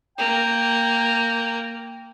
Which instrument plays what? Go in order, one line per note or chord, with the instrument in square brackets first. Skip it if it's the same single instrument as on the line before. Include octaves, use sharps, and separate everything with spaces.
[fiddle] A#3 [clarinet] G5